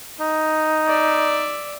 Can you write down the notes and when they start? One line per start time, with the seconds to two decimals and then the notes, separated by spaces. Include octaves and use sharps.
0.20 D#4
0.88 D5 E5